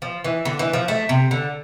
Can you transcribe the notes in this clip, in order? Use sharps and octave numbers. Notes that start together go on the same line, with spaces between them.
F3
E3
D3
E3
F3
A3
C3
D3